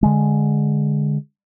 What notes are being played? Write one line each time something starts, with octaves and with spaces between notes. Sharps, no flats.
D3 G#3